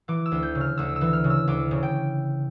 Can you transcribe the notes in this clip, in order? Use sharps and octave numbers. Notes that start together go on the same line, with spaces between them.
E3 D6
E6
D2
G6
C#3
F6
D2 E6
E6
E3
F6
C#3
E6
D2 D6
C#3
G5